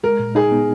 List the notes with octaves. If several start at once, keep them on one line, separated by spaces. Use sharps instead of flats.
G#3 A#4
A#2
D#4 G#4
B3